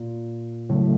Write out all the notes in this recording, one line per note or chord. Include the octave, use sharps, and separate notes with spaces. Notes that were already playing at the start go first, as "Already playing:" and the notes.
Already playing: A#2
A2 C#3 F#3 A3